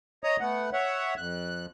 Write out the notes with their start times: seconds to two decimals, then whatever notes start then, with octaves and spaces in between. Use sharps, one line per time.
0.24 C#5 D#5 A#5 D#6
0.40 A3 B3 F#5
0.73 C#5 E5 F#5
1.18 F2 F#6